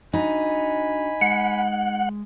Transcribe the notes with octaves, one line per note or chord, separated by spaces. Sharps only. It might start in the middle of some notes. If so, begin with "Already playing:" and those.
D4 D#4 F#4 G#5 B5
G#3 F#5